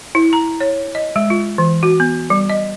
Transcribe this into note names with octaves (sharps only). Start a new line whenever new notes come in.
E4
A#5
C#5
D#5
G#3
F4
E3
F#4
B3
G3
D#5